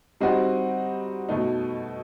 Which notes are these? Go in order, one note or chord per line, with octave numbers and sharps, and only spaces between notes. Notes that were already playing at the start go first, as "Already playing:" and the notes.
G3 C4 D#4 F#4
B2 A3 D#4